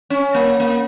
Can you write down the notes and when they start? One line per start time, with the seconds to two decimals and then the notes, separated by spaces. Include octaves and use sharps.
0.10 C#4
0.34 A#3
0.60 A#3